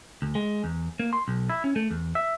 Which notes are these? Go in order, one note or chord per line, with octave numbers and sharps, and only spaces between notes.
D2
G#3
E2
A#3
C6
B1
E4
C#4
A3
E2
E5